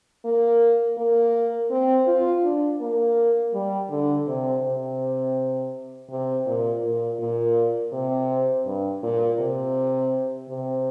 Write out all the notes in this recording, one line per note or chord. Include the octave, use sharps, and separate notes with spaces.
A#3
A#3
C4
F4
D4
A#3
G3
D3
C3
C3
C3
A#2
A#2
A#2
C3
G2
A#2
C3
C3